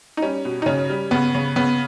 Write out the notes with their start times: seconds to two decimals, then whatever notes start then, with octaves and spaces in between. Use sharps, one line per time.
0.17 D#4
0.22 G3 C#4
0.45 B2
0.62 D#4
0.66 C#3 C#4
0.90 G3
1.11 C#3 B3
1.35 C#3
1.56 C#3 B3